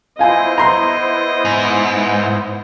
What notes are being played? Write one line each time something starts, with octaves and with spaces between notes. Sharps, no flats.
B3 E4 F4 C5 D#5 G#5
A#5 C6
G#2